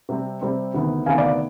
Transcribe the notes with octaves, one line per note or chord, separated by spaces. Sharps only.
C3 G3 C4
C3 G3 C4
D2 C3 D#3 B3
D2 C3 D#3 B3 F5 G#5
D5 F5
D5